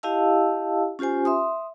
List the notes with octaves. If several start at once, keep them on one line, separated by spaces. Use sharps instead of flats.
E4 G4 D#5 F5 A5 E6
C#4 F4 G4 C5 G#5
E5 C6 D#6